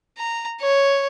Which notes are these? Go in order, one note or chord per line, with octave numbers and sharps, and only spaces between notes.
A#5
C#5